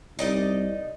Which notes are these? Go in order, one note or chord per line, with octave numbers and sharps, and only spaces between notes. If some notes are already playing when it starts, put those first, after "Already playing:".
C2 D#4 D5 D#5